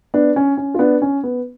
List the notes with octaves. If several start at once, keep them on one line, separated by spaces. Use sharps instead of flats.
B3 D4
C#4
C#4
F4
B3 D4
C#4
B3